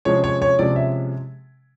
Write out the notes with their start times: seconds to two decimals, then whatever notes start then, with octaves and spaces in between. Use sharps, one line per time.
0.05 C3 F3 G#3 C#4 C#5
0.24 C#5
0.42 C#5
0.59 C3 F3 G#3 C#4 D5
0.76 E5